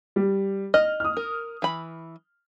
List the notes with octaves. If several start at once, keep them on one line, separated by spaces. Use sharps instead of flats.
G3
D#5 F6
D#6 F6
A#4
E3 B5